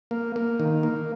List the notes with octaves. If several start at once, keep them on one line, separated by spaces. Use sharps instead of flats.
A#3
A#3
D#3
A#3